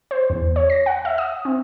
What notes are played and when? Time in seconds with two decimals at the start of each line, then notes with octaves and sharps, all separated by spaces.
0.11 C5
0.30 E2
0.56 C#5
0.70 A#6
0.86 F#5
1.05 E5
1.18 D#6
1.45 C4